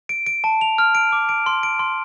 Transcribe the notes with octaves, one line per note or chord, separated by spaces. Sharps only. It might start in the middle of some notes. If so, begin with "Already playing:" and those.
D7
D7
A5
F7
F6
D7
D6
D7
C6
D7
C6